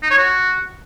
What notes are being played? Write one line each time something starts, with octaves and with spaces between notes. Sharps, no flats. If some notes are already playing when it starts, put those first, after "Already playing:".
D#4
C#5
F#4